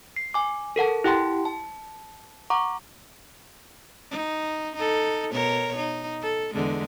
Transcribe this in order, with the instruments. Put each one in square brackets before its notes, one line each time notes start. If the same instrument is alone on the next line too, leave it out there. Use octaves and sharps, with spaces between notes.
[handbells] C7
G#5 D6
A4 A#4 F#5 A5
E4 G4 F#5 G5 A5 C6
A5
F#5 A#5 C#6 D6
[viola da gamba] D#4
D#4 A4
B2 A#4 C#5
D#4
A4
E2 D3 G#3